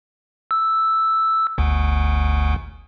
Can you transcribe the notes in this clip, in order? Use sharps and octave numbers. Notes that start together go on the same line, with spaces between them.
E6
G1 D2